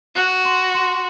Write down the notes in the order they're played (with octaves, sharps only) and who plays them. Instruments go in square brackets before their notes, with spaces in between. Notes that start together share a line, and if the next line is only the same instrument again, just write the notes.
[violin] F#4 [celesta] F#6
[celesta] C6
C6